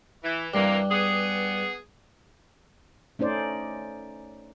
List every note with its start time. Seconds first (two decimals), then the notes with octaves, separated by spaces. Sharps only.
0.24 E3
0.54 G2 C3 E3 G3 A#3
0.91 B3 G#4
3.19 A3 C#4 D#4 C5 D5